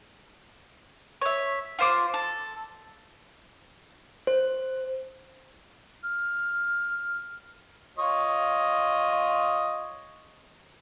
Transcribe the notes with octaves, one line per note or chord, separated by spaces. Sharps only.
C#5 E5
F4 C5 D6
A4
C5
F6
F4 C#5 D#5